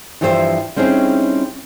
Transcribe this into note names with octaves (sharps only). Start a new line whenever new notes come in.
G2 E3 F3 G4 C5 E5
G3 C4 C#4 D#4 E4 G#4